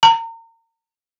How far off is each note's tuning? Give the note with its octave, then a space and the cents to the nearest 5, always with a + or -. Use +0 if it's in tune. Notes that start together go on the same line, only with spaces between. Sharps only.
A#5 -35